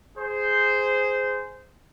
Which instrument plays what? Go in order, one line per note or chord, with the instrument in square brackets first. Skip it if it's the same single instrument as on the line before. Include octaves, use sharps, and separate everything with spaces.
[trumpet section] G#4 C5